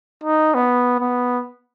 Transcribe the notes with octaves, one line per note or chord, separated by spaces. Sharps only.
D#4
B3
B3